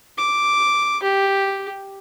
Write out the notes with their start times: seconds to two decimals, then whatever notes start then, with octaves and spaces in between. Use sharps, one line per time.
0.18 D6
1.03 G4